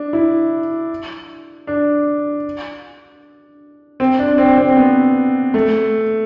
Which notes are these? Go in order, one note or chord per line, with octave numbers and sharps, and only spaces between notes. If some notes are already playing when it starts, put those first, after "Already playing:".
Already playing: D4
E4
D4
C4
D4
C4
C4
B3
A3